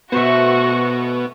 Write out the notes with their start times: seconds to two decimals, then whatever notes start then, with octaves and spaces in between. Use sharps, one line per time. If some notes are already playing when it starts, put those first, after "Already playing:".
0.12 B2 A3 B3 F#4 C5 E5 C#6